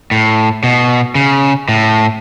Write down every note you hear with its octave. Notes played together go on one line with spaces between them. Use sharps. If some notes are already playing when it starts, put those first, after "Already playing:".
A2
B2
C#3
A2